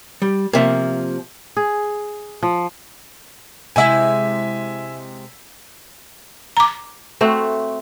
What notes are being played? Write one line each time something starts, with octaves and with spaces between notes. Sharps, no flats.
G3
C3 F3 A#3 E5
G#4
F3
C3 G#3 E4 E5 G#5
A#5 D6
A3 C4 F#4